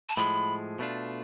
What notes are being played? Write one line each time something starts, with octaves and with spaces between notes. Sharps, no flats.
A5
A2 F3 G#3 B5
B2 A3 D4 F4